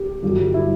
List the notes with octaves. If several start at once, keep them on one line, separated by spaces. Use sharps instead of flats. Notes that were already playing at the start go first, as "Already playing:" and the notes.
Already playing: G4
G1 G2 F#3
E4